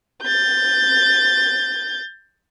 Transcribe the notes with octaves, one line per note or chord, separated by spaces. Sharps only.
G6 A6